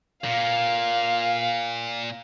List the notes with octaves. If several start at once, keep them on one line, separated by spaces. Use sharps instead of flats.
A#2 F5